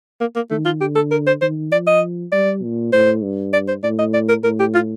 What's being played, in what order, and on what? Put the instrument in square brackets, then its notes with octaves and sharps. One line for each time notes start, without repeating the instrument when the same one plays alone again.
[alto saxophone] A#3
A#3
[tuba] D#3 [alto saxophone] A3
[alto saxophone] F4
[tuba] D3 [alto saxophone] G4
[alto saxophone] A4
A#4
C5
[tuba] D#3 [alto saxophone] C5
[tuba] F3 [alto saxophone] D5
[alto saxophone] D#5
[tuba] G3 [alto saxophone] D5
[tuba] A#2
[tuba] A2 [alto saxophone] C5
[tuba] G2
[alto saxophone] D5
C5
[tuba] A2 [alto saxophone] D5
[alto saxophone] D#5
D5
A#4
[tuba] A2 [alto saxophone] A#4
[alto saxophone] G4
F4